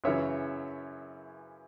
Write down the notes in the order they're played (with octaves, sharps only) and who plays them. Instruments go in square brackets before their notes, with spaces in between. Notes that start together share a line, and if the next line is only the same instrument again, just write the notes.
[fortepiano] F#2 C#3 E3 C#5 E5